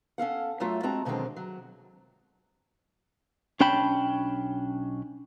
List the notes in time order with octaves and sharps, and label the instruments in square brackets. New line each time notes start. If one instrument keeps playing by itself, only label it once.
[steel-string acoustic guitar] C#4 A4 F5 F#5
F#2 F#3 A3 F4 E5
G#3 C4 F#4 A5 A#5
B2 D3 D#3 F#3 G#3 C4
F#3
[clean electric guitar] B1 C#4 D4 G5 A5 B5